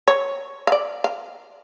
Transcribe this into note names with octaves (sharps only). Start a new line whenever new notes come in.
C#5
F5
D5
F5